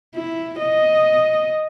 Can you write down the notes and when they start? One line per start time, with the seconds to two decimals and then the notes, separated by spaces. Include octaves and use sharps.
0.15 E4
0.60 D#5